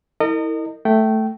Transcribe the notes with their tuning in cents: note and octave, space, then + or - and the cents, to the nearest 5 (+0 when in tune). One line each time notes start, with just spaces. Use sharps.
E4 -25 A#4 -40 D#5 -25
A3 +0 G5 -20